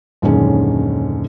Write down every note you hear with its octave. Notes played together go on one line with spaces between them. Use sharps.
D#1 F#2 D3 D#3 G#3 C#4